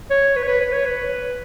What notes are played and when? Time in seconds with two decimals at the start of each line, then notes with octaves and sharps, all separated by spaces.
0.11 C#5
0.36 B4
0.43 C#5
0.48 B4
0.61 B4
0.73 C#5
0.86 B4